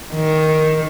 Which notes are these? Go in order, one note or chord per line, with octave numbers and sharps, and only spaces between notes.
D#3